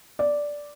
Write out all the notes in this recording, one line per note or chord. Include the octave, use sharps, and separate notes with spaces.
D5